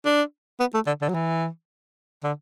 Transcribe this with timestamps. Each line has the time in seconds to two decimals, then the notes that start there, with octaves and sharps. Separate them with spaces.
0.05 D4
0.60 B3
0.74 A3
0.87 D3
1.02 D3
1.09 F#3
1.14 E3
2.24 D3